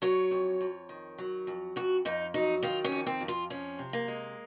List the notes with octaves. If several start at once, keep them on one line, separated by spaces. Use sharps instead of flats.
F#3 C#5
F2
F2
D#3
F#3
F2
F2 F#4
F2 D#4
F#3 D#4
D#3 F4
C#4
F2
C4
F2
F4
F3 C#4
C3
A#3
G#3